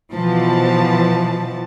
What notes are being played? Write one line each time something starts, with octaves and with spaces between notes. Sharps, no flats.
B2 E3 F3 A5